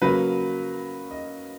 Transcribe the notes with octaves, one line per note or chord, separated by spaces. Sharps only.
C#3 F#3 A#3 B4
D#5